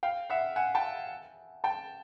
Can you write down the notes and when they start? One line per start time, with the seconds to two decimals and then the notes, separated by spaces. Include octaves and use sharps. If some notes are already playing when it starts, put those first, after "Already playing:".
0.03 F5 G5
0.30 E5 F#5
0.56 F#5 G#5
0.75 G5 A5
1.64 G5 A5